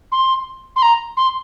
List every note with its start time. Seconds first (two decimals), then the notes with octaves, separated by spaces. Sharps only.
0.12 C6
0.76 C6
0.82 A#5
1.17 C6